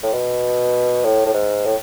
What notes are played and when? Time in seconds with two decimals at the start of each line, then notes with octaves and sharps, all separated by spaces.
0.03 A2
0.13 B2
1.04 A2
1.26 A2
1.34 G#2
1.65 A2